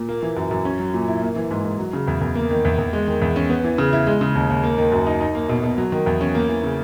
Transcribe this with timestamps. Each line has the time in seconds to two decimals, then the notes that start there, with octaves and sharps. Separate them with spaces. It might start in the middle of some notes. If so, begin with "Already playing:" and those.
Already playing: A#2
0.09 A#3
0.23 E3
0.37 F#2
0.51 F#2
0.65 C#4
0.80 F#3
0.94 A#2
1.08 E4
1.22 A#3
1.36 E3
1.51 G#2
1.65 G#2
1.79 F#3
1.93 C#3
2.08 E2
2.21 E2
2.35 A#3
2.51 D#3
2.65 E2
2.78 E2
2.93 G#3
3.07 D#3
3.22 E2
3.36 C#4
3.50 B3
3.64 E3
3.78 C#3
3.93 E4
4.07 G#3
4.21 C#3
4.35 D#2
4.50 D#2
4.64 A#3
4.78 D#3
4.92 F#2
5.07 D#4
5.21 D#4
5.35 A#3
5.49 B2
5.63 B2
5.78 F#3
5.92 D#3
6.06 E2
6.21 C#4
6.35 A#3
6.49 E3
6.63 C#3